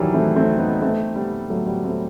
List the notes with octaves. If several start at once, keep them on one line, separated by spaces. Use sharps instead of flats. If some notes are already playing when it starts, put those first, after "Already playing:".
Already playing: D#3 E3 F#3 G3
A3 C4
A3 C4
B3 D#4
A3 C4
G3 B3
F#3 A3
G3 B3
A3 C4